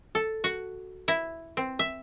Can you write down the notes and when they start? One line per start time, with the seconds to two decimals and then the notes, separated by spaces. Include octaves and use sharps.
0.15 A4
0.44 F#4
1.08 E4
1.57 C4
1.79 E5